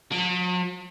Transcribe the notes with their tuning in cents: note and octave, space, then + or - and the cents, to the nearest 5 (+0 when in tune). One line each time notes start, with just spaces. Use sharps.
F#3 -45